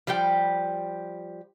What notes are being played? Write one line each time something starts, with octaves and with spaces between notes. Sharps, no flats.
F3 G3 G4 G5